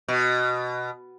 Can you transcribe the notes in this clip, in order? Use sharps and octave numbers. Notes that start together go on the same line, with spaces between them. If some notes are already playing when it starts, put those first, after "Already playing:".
B2